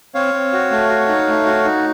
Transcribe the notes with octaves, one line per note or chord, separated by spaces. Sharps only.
C4 C#5 F5
C4
F#4
A3
F#4
D#4
A3
F#4
D#4